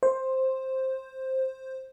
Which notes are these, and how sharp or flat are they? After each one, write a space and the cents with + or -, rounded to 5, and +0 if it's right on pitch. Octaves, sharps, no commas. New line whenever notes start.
C5 +10